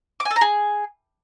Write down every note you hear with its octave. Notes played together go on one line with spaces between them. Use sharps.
D6
G#5
A4
A#5
G#4